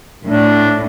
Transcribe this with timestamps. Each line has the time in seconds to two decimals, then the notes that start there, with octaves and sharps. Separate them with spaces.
0.24 A2 D4